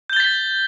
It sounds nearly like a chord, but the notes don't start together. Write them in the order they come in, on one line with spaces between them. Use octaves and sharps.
G6 G7 A6 B6